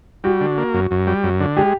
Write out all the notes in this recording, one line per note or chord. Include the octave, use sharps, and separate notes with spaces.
G3 F#4
D3
A#3
F#2
F#2
G3
F#2
D3
G#3 G4